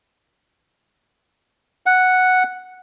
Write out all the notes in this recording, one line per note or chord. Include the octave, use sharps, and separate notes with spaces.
F#5